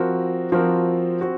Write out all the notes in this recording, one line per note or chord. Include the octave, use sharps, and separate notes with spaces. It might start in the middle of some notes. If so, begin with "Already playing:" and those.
Already playing: F3 C4 F#4 A#4
F3 C4 F#4 A#4
C4 F#4